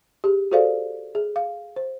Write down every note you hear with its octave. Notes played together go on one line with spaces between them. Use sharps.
G4 G#4
F#4 G#4 A4 C5 D5 F5
G#4
F5
C5